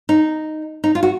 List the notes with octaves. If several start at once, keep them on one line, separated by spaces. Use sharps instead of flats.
D#4
D#4
F4
F#4